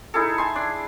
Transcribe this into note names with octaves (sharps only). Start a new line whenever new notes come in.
D#4 E4 G#4 A4
G#5 C6
D4